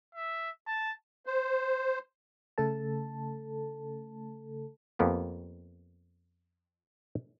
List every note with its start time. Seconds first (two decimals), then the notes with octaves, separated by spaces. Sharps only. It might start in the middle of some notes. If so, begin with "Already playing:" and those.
0.15 E5
0.67 A5
1.26 C5
2.58 C#3 A3 A4 A5
4.99 F2 A#3 B3 G4